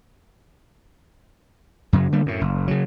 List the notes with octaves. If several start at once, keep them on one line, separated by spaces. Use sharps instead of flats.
F#2 C#3 F#3
D3 G3 A#3
F#2 A2
F#1
C#3 F#3